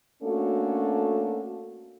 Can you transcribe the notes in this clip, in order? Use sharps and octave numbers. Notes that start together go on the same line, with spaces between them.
A3 A#3 C#4 D4 F#4 A4